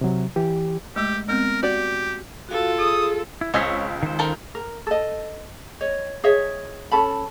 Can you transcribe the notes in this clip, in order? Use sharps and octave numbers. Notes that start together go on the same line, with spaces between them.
C3 F#3
E3 G4
G#3 A3 G4
G#3 B3 C4 A#4
F#4 G4 D5
F4 F#4 A4 F5
G#4 D#6
E4
C#2 C4 C#5 D#5 G#5 E6 B6
D#3 C5
A4 A#4 G5
A#4
A4 D#5
C#5 D#5
G#4 C#5 D#5 E5
C#4 A4 A5 B5